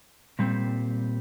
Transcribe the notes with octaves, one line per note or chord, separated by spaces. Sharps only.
A#2 G3 C4